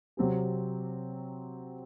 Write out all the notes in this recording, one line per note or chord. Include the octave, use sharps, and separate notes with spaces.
C3 F#3 C4 G4